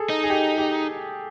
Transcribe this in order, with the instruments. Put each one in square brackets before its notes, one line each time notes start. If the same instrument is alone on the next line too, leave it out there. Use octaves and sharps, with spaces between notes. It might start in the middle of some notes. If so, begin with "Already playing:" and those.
Already playing: [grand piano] G#4 A4
[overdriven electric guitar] D#4
[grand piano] G#4
G4
G4